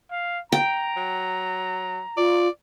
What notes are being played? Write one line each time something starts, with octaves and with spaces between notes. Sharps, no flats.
F5
G5 A#5
F#3
F4 D5